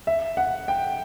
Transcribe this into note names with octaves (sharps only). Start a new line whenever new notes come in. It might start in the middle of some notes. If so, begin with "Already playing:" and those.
E5
F#5
G5